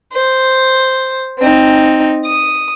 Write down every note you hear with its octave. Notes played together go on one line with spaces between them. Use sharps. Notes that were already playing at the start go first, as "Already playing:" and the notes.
C5
C4 D#4
D#6